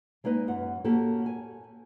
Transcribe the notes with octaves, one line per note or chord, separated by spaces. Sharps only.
G#3 A#3 D#4 B4 D#5
F#2 F#5
A#3 C#4 F#4 G4 A4
G#5